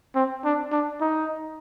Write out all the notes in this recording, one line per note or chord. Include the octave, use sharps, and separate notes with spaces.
C4
D4
D4
D#4